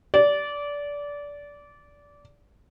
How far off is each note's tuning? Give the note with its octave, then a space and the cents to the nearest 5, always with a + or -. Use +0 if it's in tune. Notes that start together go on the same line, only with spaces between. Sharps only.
D5 -20